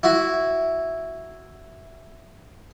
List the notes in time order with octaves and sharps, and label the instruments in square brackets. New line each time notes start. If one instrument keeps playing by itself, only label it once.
[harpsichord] E4 F#4